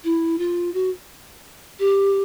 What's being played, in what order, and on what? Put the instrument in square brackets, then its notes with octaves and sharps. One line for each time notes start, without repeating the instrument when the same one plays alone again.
[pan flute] E4
F4
F#4
G4